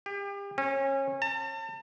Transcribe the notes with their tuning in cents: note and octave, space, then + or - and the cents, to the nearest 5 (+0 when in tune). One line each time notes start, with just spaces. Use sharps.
G4 +35
C#4 -30
A5 +40